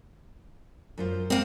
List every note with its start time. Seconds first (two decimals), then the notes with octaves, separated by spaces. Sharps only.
0.98 F#2 F4 C5
1.30 A#3 C4